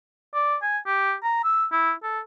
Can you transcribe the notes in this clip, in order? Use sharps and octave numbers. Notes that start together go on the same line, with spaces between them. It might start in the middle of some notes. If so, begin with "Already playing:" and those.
D5
G#5
G4
A#5
E6
E4
A4